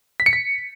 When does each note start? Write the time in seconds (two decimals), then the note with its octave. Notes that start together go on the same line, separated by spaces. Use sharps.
0.20 B6
0.26 C#7
0.33 B6